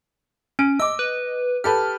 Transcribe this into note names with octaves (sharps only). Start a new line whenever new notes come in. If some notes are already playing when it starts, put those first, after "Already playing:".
C#4 D7
D#5 D6 E6
B4
G4 A4 B4 F6